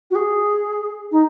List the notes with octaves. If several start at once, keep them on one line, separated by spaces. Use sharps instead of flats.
F#4
G#4
D#4